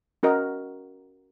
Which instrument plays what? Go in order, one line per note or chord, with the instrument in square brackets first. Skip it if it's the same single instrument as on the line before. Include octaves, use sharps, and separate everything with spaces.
[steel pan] C#4 F#4 A#4 D#5